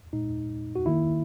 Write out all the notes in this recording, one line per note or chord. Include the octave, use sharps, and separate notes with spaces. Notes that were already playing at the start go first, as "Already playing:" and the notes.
A#2 G#3 D#4
F#4
D#3 A#3 E4